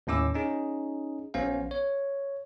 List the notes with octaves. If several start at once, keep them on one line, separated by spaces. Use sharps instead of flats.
D#2 A2 C#4 D6 E6
C#4 D#4 G#4
A#1 B3 C#4 C5 F5
C#5